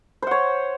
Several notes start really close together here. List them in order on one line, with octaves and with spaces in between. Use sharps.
C5 F#5 C#5